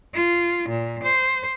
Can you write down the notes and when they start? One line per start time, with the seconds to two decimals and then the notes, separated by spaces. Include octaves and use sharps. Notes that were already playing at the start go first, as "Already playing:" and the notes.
0.14 F4
0.69 A#2
1.03 C5